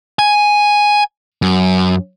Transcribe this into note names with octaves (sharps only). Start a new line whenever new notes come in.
G#5
F#2